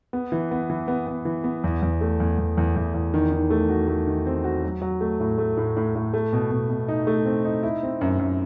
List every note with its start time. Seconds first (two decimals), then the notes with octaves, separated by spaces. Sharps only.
0.13 B3
0.32 E3
0.51 B3
0.70 E3
0.88 B3
1.07 B3
1.25 E3
1.44 B3
1.64 E2
1.82 E2
2.01 A3
2.20 E2
2.38 E2
2.57 E2
2.76 E2
2.94 E2
3.14 D#3
3.32 D#3
3.50 A3
3.69 F#4
3.88 A3
4.07 D#3
4.26 C4
4.44 F#4
4.63 F#3
4.82 F#3
5.01 A3
5.20 A2
5.38 A3
5.57 A2
5.77 A2
5.95 A2
6.13 A3
6.33 B2
6.51 B2
6.69 B2
6.88 D#4
7.07 A3
7.25 C4
7.45 D#4
7.63 E4
7.83 C4
8.01 F#2
8.19 F#2